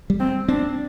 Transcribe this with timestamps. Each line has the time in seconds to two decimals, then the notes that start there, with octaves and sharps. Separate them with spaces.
0.10 G3
0.20 C4
0.49 C4 D4